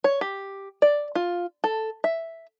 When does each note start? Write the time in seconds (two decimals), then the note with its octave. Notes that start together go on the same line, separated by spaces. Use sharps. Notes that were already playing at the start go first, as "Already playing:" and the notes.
0.04 C#5
0.21 G4
0.82 D5
1.15 F4
1.64 A4
2.04 E5